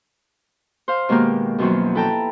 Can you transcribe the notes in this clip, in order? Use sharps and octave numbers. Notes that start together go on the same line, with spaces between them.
C5 F5
B2 D#3 G#3 A#3 G4 A#4
F#2 B2 D#3 F3 F#3
E4 A4 B4 G5 A5 A#5